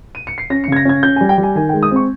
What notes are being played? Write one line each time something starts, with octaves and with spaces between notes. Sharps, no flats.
D#7
C#7
C7
C#4 A#6
C#7
C#3 G#6
A#6
C#4 G#6
C#4 G6
G#5
G3
G5
G3
G#5
D#3 G#5
G5
G#3
D#6
C4 C#6